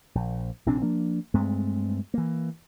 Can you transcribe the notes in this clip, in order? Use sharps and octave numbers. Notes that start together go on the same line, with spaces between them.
A#1
A#1 C3 C4 D4
F3 A#3 D4
G2 G#3 A3 C4
E3 A#3